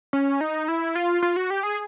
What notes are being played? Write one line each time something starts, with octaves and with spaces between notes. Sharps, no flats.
C#4
D#4
E4
F4
F4
F#4
G4
G#4